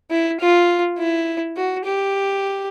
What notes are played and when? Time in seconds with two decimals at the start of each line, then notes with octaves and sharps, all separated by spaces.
0.11 E4
0.40 F4
0.98 E4
1.57 F#4
1.85 G4